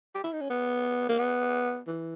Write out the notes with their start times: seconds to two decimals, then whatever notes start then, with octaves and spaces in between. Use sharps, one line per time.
0.15 G4
0.24 E4
0.32 D#4
0.41 C#4
0.50 B3
1.09 A#3
1.19 B3
1.87 E3